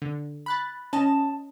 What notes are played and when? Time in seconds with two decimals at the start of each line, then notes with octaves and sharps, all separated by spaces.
0.02 D3
0.46 B5 F#6 A6
0.93 C#4 D#5 A5